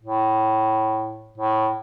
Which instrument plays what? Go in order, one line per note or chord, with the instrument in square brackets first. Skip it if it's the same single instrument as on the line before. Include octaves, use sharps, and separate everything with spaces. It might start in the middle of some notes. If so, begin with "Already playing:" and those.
[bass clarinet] A2
A2